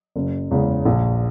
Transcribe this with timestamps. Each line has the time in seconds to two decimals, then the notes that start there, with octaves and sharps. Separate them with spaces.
0.16 F#1
0.51 E2 C#3 G#3
0.85 A#1